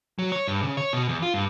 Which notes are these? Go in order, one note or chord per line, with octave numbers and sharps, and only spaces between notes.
F#3
C#5
G2
C#3
C#5
B2
E2
F4
G2